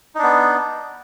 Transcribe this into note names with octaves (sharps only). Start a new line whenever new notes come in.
B3 D4 D#4